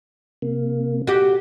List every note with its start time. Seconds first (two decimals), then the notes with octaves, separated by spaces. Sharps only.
0.42 C3 A#3
1.07 F#4 G4